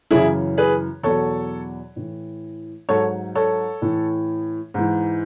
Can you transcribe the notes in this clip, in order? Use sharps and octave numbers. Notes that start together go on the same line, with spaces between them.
F#2 C#3 E3 E4 G#4
G#4 B4
E2 B2 F#3 A4 C#5
A2 E3
G#2 F#3 A4 C#5
A4 C#5
A2 E3
G#2 E3